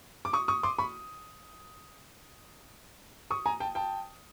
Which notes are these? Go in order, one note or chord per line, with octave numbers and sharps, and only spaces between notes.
D6
C#6 D#6
C#6 D#6
C6 D6
B5 C#6
C#6 D#6
G#5 A#5
G5 A5
G5 A5